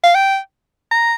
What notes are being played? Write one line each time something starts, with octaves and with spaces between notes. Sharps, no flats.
F5
G5
A#5